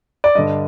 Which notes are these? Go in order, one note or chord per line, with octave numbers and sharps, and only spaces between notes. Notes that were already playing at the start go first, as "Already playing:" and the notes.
D5
G2 D3 D#5